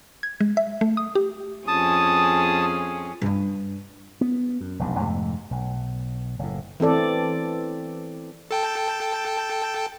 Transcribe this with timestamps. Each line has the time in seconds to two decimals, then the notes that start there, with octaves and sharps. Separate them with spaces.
0.23 G#6
0.41 G#3
0.57 E5
0.81 A3
0.97 D#6
1.15 G4
1.68 F2 C#4 G#4 A5 D#6
3.22 G2 D4
4.21 B3
4.61 F#2
4.79 F1 B1 G2
5.00 F2 G#2 C3 A3
5.51 B1
6.39 F#1 A2
6.80 E3 C4 A4 D5
8.51 A4 G5 A5